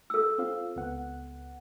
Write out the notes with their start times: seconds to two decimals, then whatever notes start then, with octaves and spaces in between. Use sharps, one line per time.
0.10 A4 E6
0.38 C4 F4 F5
0.76 C#2 B3 F#5